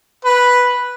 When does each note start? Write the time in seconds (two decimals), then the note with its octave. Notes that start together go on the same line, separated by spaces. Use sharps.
0.25 B4